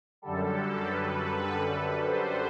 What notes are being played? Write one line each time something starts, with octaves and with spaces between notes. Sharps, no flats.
F#2 D3 G3 A4
B4
C5